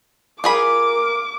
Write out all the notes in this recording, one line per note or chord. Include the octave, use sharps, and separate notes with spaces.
F4 G#4 A#4 B5 D6